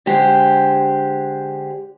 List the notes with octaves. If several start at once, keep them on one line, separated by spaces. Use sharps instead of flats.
D3 G#3 G4 C5